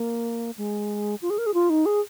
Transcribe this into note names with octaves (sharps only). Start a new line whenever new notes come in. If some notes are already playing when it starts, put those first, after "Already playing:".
Already playing: A#3
G#3
F4
G#4
A#4
G#4
F4
D#4
G#4